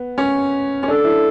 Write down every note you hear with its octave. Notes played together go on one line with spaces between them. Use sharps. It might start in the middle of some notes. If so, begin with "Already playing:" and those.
Already playing: B3
C#4
C#4
D4 A4
E4